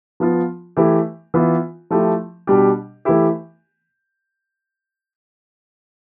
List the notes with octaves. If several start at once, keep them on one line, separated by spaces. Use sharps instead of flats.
F3 B3 F4
E3 A3 E4 G4
E3 B3 F4
F3 A3 E4 G4
B2 G3 D4 G4
E3 A3 E4 G4